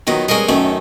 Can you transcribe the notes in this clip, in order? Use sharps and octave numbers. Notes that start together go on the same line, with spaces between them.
D#3 F#3 B3 F4 D#5
G3 G#3 C#4 A#4 D#5
F#2 D#3 A3 C#4